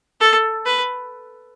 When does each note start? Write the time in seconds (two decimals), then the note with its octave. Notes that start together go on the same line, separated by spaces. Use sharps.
0.21 A4
0.66 B4